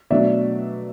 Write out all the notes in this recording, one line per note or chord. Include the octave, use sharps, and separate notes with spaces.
B2 F#3 A3 D4 D5 E5